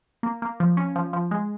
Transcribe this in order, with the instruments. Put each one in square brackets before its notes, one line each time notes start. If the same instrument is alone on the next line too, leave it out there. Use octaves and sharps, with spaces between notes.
[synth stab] A#3
A#3
F3
C#4
F3
F3
G#3